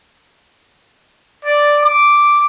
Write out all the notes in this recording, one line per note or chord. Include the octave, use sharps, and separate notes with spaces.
D5
D6